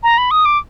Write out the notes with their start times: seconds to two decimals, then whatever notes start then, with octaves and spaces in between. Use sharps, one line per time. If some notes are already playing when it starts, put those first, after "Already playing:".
0.03 A#5
0.18 B5
0.31 D#6
0.45 D6